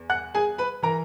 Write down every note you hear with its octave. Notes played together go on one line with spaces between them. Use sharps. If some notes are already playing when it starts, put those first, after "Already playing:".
Already playing: E2
F#5 F#6
G#4 G#5
B4 B5
E3 A#4 A#5